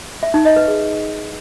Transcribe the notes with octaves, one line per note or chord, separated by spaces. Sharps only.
E5
D#4
D#5
B4
G#4